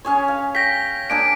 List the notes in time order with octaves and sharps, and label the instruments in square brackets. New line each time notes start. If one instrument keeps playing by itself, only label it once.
[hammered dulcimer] C#4 G#4 C#5
F5
[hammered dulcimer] G5 [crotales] A#6 B6
[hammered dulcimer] A#3 D4 G#4 [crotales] D7